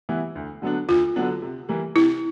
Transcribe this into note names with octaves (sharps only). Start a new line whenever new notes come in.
E3 G3 B3 E4
D2
D3 F#3 B3 D4
D2 F4
D3 F#3 B3 D4
C3
E3 G3 A#3
C3 E4